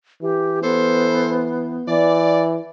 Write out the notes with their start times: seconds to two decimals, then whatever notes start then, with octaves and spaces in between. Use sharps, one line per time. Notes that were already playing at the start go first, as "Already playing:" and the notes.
0.22 E3 G4
0.63 B3 A4 C5
1.88 E3 D5